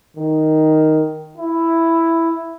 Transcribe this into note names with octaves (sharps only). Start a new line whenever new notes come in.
D#3
E4